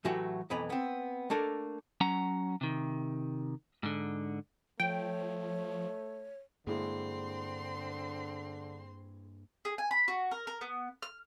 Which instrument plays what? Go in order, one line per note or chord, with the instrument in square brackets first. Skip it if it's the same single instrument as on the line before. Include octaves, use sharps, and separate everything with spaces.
[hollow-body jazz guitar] A2 E3 F#3 A3 F#4 G4
B1 F2 E3 B3 A#5 B5
B3 C4
A3 A#3 D4 A4 A#4
[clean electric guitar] F#3 C#4 F#5 A#5
C3 D#3
G#2 D3
[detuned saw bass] F3 [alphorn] A3 [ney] C#5 [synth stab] G5
[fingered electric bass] G2 A#3 [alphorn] D3 [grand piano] G#3 E4 [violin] C4 C6
[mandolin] G#4
G#5
B5
F#4
A#4
A#4
B3
F6